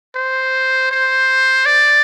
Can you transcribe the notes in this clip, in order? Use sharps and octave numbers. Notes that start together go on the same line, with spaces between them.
C5
C5
D5